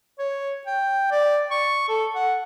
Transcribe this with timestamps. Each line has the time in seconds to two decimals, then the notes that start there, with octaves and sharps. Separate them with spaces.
0.19 C#5
0.67 G5
1.11 D5
1.50 C#6
1.88 A4
2.14 F#5